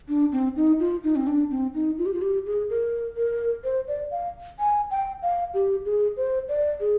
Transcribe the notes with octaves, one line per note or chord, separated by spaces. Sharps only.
D4
C4
D#4
F4
D#4
C4
D4
C4
D#4
F4
G4
F4
G4
G#4
A#4
A#4
C5
D5
F5
G#5
G5
F5
G4
G#4
C5
D5
G#4